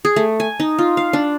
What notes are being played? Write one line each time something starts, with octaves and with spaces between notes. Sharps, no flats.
G#4
A3
G#5
D#4
F4
F5
D4